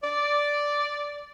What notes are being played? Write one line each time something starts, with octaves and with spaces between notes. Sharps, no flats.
D5